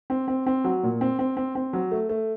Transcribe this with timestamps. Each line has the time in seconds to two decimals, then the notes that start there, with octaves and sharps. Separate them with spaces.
0.10 C4
0.28 C4
0.46 C4
0.64 F#3
0.83 A#2
1.01 C4
1.19 C4
1.37 C4
1.55 C4
1.73 F#3
1.91 A3
2.09 A3